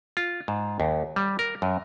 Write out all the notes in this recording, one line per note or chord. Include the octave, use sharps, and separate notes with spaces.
F4
G#2
D#2
G3
A#4
F#2